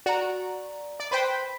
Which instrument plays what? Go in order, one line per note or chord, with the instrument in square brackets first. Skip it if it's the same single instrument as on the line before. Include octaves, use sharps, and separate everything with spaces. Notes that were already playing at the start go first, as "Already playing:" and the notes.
[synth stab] F#4 [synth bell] D5 A#5
[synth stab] D5
[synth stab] B4 C5 G5 [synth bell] B5 B6